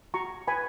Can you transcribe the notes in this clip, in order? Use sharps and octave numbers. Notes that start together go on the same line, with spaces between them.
F#4 A#5 C#6
B4 G#5 B5